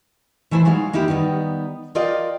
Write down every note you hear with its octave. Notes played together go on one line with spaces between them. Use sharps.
E3 A3 E4 B4 C5
F#3 G#3 D#4 F5
A#3 D#4 E4 G4
D#3 G3 B3 D#4
F4 A#4 D5 D#5 F5 G5